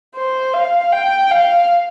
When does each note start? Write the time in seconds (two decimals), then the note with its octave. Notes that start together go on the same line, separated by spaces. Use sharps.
0.16 C5
0.54 F5
0.92 G5
1.31 F5